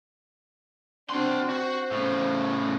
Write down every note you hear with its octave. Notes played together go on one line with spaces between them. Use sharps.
C4 D4 F#4 C6
F#4 C5
A2 C#3